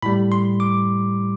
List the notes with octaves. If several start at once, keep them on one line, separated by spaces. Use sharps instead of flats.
A2 G3 B5
C6
D6